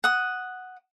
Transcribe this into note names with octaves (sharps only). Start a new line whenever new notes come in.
F#5 D#6